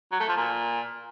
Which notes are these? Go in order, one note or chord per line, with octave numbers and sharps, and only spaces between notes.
F#3
A3
F3
A#2